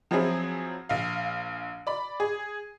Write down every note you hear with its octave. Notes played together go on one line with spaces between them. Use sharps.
F3 F#3 C4 E4 G#4
A#1 F5
D5 B5
G#4